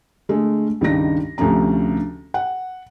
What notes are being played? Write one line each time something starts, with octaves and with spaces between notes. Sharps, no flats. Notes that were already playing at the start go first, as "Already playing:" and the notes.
D3 G#3 A3
C#2 G2 D#3 D4 D#4 A#6
D2 C3 F3 C#4 A#5
F#5